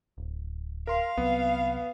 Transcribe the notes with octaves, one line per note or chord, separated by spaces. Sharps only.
D1
A#4 F5 C6
C2 F#3 B3 C4